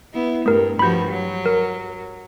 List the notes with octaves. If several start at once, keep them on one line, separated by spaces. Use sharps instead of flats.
B3 E4
G2 A3 A#4
G2 F3 F#4 B5 G6
F#3
A#4